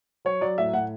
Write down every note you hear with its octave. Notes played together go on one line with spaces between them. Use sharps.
F#3 C#5
F#3 D5
A2 E5
A2 F#5